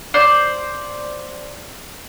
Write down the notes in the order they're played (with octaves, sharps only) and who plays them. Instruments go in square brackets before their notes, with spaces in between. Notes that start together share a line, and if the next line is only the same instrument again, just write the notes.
[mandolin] C5 D5